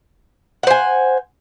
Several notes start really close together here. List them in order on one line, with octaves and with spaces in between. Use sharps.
F#5 C5 G#5